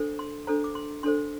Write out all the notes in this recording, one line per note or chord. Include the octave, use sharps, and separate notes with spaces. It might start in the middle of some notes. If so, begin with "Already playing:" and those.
Already playing: D4 A4 C5
C6
D4 A4 C5 A#5
D6
C6
D4 A4 C5 C6